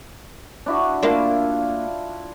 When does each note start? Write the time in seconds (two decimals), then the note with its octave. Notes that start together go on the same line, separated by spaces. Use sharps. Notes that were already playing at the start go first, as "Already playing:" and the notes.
0.66 D4 E4 F#4
1.03 A#3 D4 E4 F4